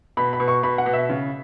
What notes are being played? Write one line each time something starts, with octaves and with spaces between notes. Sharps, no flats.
B2 B5
B5
B2
C#6
B2 B5
F#5
B2
E5
C#3